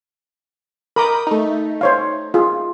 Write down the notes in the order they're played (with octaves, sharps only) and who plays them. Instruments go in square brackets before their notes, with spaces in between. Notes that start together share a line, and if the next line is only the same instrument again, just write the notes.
[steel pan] A#4 A#5 D6 [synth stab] B5 D#6 G6
[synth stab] A3 D#4
[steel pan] C5 C#5 F5
F4 G#4